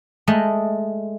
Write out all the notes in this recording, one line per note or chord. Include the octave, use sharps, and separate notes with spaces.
G#3 A3 D#5